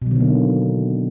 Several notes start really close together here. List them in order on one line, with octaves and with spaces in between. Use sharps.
B2 F#3 D#3 D3 A#3